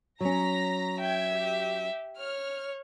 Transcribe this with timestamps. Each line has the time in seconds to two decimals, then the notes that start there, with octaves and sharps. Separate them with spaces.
0.21 F#3 C#4 A#5 A#6 B6
1.00 E5 G5 G#6
1.33 G4
2.19 C#5 F6